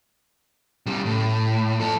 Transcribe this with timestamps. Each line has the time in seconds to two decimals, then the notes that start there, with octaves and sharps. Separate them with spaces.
0.86 C#3 G3
1.06 A2
1.80 F3 A4